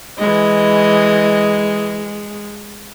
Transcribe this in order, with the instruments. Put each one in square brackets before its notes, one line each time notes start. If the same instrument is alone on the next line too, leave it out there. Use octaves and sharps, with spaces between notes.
[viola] E3 D#5 [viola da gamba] G#3